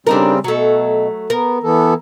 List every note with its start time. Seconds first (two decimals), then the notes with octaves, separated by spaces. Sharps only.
0.07 C#3 G3 C4 D4 D#4 A#4
0.44 B2 F#3 A3
1.30 B3 A#4
1.63 E3 B3 A4